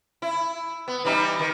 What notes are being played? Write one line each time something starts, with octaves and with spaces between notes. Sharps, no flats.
E4
B3
E3 G3 D#4
D#3